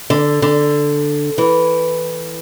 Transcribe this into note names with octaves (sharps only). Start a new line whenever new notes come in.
D3
D3
E3